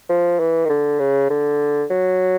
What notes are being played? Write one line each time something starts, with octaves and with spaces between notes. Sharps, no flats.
F3
E3
D#3
D3
C#3
D3
F#3